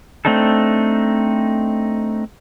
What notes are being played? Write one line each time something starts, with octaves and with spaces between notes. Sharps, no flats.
A3 C4 D4 D#4 A4